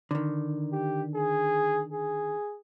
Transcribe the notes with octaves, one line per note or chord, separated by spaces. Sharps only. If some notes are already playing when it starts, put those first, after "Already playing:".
D3 D#3
G4
G#4
G#4